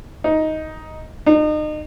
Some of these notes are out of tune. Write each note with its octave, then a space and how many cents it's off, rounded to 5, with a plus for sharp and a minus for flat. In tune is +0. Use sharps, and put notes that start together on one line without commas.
D#4 +10
D#4 -35